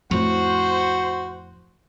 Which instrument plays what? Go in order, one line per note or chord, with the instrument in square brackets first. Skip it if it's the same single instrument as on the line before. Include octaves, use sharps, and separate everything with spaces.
[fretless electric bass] F2 A2 [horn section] F#4 C5